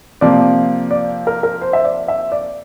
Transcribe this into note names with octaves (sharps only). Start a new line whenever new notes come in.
C3 F3 A#3 D5
D5
A#4
A#4
C5
E5
D5
E5
D5